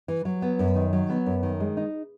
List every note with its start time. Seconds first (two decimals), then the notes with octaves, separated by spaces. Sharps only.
0.08 E3
0.25 F#3
0.42 B3
0.59 F#2
0.75 D#3
0.93 F#3
1.10 B3
1.26 F#2
1.43 D#3
1.60 G#3
1.77 D#4